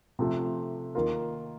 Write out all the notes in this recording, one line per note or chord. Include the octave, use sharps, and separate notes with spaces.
C3 F3 A3
D#3 A#3 F4 A#4